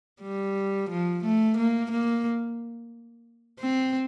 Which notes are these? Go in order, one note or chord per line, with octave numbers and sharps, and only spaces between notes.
G3
F3
A3
A#3
A#3
C4